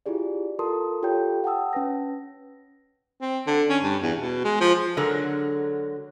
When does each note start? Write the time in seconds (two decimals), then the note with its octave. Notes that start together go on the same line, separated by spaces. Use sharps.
0.06 E4 F4 G4 G#4 D5
0.59 F4 A4 A#4 A5 C6 D#6
1.03 F4 G4 A4 C#5 G5 G6
1.44 F#5 G5 A5 D#6 E6
1.73 C#4 B4 A#6
3.20 C4
3.47 D3
3.69 C#4
3.83 G2
4.02 E2
4.18 B2
4.44 G#3
4.61 F3
4.97 D3 F#3 G#3 A#4